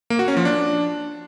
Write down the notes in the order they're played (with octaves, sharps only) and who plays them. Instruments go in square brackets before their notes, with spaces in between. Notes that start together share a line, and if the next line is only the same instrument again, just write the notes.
[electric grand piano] A#3
F#4
C#4
F3
D4